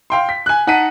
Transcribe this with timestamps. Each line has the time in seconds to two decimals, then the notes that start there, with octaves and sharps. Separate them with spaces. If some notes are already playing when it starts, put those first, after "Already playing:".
0.10 F5 G5 C6
0.29 B6
0.46 G#5 F#6
0.67 D#4 F#5 A5 B6 D#7